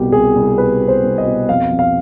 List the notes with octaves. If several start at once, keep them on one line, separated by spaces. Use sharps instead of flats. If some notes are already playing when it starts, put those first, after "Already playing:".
Already playing: C2 B2 G4
C2 G#4
C2
B2 B4
B2
C5
C2
D#5
B2
F2 F5
F2
F5